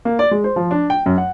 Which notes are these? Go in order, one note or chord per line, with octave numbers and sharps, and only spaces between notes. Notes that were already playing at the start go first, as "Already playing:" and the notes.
A#3
D5
G#3
C5
F3
D4
G5
F#2
F#5